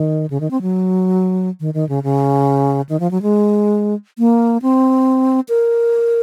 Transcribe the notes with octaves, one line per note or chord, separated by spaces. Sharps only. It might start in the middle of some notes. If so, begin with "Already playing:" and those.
Already playing: D#3
C#3
D#3
C4
F#3
D#3
D#3
C#3
C#3
D#3
F3
F#3
G#3
A#3
C4
A#4